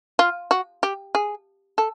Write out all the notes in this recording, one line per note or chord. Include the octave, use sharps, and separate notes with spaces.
F4
F#4
G4
G#4
A4